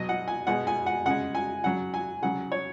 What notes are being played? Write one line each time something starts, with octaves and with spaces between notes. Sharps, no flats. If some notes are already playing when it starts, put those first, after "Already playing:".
Already playing: B2 F#3 D#5
F#5
G#5
B2 G#3 F#5
G#5
F#5
C#3 G#3 F#5
G#5
C#3 F#3 F#5
G#5
C#3 F#3 F#5
C#5